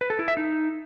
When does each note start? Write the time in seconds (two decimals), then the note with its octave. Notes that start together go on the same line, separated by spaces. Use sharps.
0.01 B4
0.10 A4
0.19 E4
0.28 E5
0.37 D#4